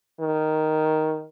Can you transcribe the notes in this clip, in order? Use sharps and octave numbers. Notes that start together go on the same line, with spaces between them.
D#3